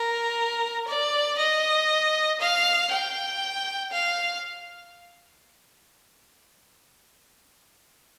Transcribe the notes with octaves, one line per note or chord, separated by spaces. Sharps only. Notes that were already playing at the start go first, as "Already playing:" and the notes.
Already playing: A#4
D5
D#5
F5
G5
F5